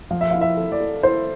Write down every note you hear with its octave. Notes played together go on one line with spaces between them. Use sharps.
F3 F5
E5
F5
E4
E5
A4
D5
A4
E4 C5